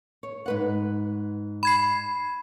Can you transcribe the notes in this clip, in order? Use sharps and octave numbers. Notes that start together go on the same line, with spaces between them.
C#5
G#2 B4 F#5
B5 G#6 C7